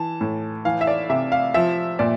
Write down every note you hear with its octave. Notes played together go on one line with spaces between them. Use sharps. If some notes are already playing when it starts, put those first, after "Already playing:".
Already playing: E3 A5
A2
E3 F5
E5
D5
C3 E5
F5
F3 E5
A#2 D5